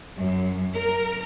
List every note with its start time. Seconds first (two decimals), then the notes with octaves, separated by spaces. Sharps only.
0.17 F#2
0.74 A#4